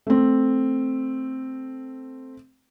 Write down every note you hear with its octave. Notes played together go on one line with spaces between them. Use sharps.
A3 C4